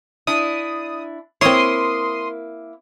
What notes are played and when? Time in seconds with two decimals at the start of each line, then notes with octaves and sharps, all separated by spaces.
0.27 D4 E4 D#6
1.41 A#3 C4 E4 C#5 C6 D#6